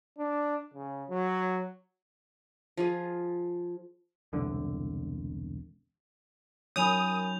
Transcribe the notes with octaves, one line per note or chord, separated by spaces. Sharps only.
D4
C#3
F#3
F3 F4 G#4
E1 C2 D3
F#2 D#3 C#5 G#5 B5 D#6 G6 F7